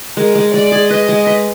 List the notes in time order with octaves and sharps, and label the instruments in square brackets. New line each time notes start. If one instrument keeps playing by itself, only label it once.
[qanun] G#3 [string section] A#4
[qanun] G#3
[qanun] G#3 [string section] D5
[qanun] G#4
[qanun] B4 [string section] D#5
[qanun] G#3
B4